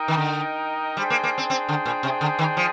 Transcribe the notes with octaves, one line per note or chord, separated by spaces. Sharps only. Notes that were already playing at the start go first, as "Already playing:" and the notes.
Already playing: D#4 A#4 D#5 G5
D#3
D3
G3 D4 G#4 C5 G5
A#3
A#3
C4
C4
D3
A#2
C3
D3
D#3
F3